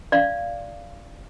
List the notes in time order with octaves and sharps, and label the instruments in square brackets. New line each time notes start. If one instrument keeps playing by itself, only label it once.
[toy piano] D5 F5